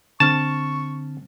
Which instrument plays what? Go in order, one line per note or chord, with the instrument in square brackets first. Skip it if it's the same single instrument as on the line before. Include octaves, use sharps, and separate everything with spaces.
[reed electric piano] D3 C4 F6 [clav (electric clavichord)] A5 [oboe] C#6